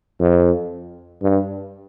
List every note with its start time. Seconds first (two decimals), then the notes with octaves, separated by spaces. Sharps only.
0.20 F2
1.22 G2